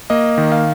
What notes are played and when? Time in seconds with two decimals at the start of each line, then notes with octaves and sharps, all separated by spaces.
0.10 A#3 D#5
0.38 D#3
0.52 F5